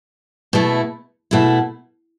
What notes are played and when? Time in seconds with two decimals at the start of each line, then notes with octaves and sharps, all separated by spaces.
0.53 B2 A3 E4
1.31 B2 A3 E4